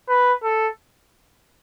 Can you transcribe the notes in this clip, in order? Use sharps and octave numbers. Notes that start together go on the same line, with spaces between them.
B4
A4